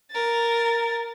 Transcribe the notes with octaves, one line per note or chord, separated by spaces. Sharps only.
A#4 A6